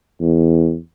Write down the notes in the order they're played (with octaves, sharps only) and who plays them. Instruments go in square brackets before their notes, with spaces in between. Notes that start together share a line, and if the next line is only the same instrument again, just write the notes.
[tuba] E2